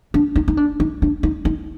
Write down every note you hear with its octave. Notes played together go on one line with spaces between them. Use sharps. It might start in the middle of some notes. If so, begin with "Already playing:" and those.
D4
D#4
D#4
D4
D#4
D4
D#4
D#4